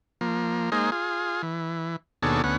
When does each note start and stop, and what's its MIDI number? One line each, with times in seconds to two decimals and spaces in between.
0.21 0.70 53
0.21 0.70 58
0.72 0.90 56
0.72 0.90 58
0.72 0.90 63
0.72 0.90 68
0.72 0.90 72
0.92 1.42 65
0.92 1.42 68
1.43 1.96 52
2.23 2.42 39
2.23 2.42 47
2.23 2.42 62
2.23 2.42 68
2.23 2.42 69
2.23 2.42 73
2.44 2.57 38
2.44 2.57 59
2.44 2.57 61
2.44 2.57 78